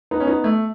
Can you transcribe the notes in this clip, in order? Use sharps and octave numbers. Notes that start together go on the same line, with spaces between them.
B3 D#4
C#4
B3 D#4
A3